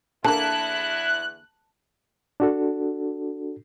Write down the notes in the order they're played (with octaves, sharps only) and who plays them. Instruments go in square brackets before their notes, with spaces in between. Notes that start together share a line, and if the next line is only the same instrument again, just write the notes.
[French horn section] E2 E4 [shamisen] D3 A#3 [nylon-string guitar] A5 [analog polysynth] F#6
[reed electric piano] D4 F#4 A4